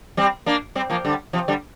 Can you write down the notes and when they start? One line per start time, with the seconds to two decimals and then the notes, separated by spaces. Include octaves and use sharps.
0.17 G3 C4
0.46 A#3 D4
0.75 G3 C4
0.90 F3 A#3
1.05 D3 G3
1.33 C3 F3
1.48 D3 G3